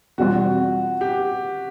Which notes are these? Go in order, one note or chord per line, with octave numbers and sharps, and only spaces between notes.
E2 B2 G3 C4 F4 F#4
G4